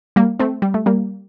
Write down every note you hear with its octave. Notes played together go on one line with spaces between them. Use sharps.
G3 A#3
A3 C4
G3
A3
G3 A#3